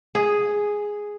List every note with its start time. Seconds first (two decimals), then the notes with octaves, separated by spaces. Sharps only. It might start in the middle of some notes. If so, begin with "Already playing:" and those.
0.15 G#4